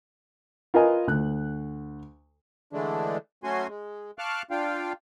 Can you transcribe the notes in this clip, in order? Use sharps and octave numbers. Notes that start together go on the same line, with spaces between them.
F4 A#4 B4 D#5 G#5
D2 F#6
D3 E3 G#3 A3 D4
F#3 A3 C#4 F#4 G#5 C6
G#3
F5 A5 C#6 D6 F6 F#6
D4 F4 F5 G5